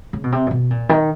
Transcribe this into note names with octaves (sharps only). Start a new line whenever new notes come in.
C#3
B2
C3
A#2
B2
A#2
D#3